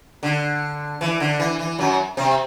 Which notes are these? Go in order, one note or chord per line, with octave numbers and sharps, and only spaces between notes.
D3
E3
D3
E3
E3
F#2 F#3
C3 C4